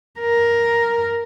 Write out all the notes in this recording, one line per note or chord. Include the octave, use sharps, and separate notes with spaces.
A#4